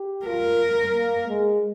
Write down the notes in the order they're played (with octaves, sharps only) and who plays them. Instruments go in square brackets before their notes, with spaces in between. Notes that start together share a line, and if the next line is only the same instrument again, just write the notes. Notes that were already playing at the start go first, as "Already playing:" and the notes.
Already playing: [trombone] G4
[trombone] F4 [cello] A#4
[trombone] A#3
G#3